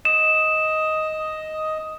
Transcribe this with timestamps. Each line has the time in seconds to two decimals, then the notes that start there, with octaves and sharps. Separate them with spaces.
0.05 D#5 E7